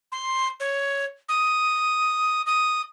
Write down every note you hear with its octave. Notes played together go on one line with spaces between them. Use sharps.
C6
C#5
D#6
D#6